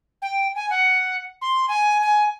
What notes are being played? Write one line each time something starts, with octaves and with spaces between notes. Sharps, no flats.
G5
G#5
F#5
C6
G#5
G#5